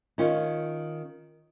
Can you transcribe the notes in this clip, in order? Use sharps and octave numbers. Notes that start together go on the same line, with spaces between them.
D#3 C#4 F4